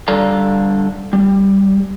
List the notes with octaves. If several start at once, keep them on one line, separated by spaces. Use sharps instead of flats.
D3 G3 A4 D5 F5 A#5
G3